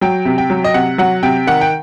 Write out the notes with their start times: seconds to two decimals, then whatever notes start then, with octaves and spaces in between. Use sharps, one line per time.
0.01 F#3 G5
0.25 C3
0.38 G5
0.50 F#3
0.64 D#5
0.74 C3 F#5
0.98 F#3 F#5
1.23 C3 G5
1.47 D#3 F#5
1.61 G5